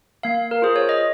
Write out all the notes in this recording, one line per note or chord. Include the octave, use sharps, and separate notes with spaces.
A#3 F5
A#4
F4 G#4 C5
C#5
D#5